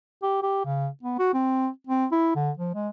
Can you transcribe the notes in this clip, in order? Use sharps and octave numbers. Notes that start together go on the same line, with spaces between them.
G4
G4
C#3
B3
F#4
C4
C4
E4
D3
F3
G#3